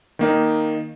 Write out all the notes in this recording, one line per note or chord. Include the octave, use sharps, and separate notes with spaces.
D#3 A#3 D#4